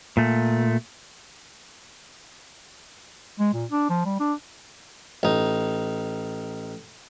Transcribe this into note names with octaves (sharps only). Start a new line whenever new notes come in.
A#2 A3
G#3
A#2
D4
F3
G3
D4
A1 D#4